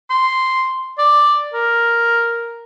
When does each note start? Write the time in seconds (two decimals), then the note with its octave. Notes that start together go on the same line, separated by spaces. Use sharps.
0.10 C6
0.98 D5
1.54 A#4